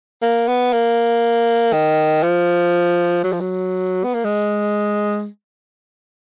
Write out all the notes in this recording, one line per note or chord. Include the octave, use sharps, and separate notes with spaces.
A#3
B3
A#3
D#3
F3
F#3
F3
F#3
B3
A#3
G#3